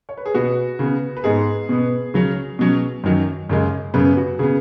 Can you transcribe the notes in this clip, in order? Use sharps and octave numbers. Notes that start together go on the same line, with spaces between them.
C#5
B4
G#4
B2 B3 F#4
C#3 B3
B4
G#2 G#3 B3 G#4
B2 B3
C#3 F#3 C#4
B2 F#3 C#4
F#2 D#3 F#3
F#2 C#3 G#3
F#2 C#3 B3 B4
F#4
C#3 B3 G#4